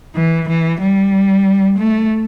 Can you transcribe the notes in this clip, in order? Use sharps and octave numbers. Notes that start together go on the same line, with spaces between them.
E3
E3
G3
A3